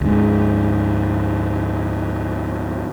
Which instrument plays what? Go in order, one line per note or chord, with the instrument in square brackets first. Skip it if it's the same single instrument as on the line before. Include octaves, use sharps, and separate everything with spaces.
[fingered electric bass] D2 G#2